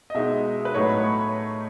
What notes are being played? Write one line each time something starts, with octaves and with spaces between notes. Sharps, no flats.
D#5
B2 G#3 D#4 E5
B4
A2 F#3 A3 D#4 C#5
B5
C#6